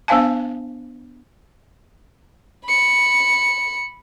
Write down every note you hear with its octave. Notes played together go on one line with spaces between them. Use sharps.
B3 D4 C5 F5 G#5 A5
B5 C#7